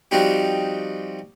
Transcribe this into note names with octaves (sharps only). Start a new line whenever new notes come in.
F3 G3 C4 D#4 F#4 G4